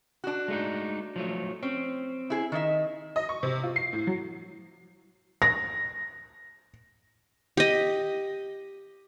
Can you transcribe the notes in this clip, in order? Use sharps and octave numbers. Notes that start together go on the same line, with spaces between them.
D4 F#4
G#3 A3 D#4
F3 F#3 A3
C4 C#4
E4 G#4
D#3 D#4 E5
D#5
C#6
C3
F4
C7
A2
F#3
A#6
G4 D#5